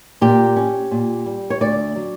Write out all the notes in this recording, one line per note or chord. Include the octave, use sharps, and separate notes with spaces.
A#2 G4
C#4
A#2
G3
C#5
D2 D5
F#3